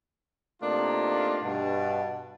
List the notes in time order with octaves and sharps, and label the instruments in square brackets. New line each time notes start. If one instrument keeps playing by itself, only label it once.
[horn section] C3 A3 A#3 D4 D#4 F4
G2 B2 A5